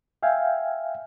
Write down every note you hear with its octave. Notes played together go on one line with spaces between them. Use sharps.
E5 F5 G5 G#5